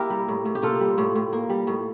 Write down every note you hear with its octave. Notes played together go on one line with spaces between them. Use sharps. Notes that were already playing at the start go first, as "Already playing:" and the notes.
Already playing: A#3 E4 G4 A#4
G3
A2
A2
G4
A#3 F4 A4
G3
A2
A2
A#3
G3
A2